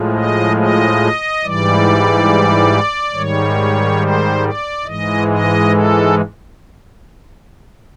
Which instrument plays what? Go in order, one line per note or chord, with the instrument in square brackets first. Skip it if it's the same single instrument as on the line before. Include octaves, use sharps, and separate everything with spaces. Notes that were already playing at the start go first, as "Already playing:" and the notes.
Already playing: [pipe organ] A2 F3 G#3
D#5
D#5
G#2 E3 G3 D5
G#2 D#3 G3 C#5
C5
D5
G#2 E3 G#3 D#5
D#5
A4